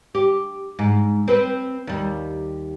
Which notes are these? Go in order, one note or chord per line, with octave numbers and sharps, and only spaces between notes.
G4
G#2
C4 B4
D#2 G3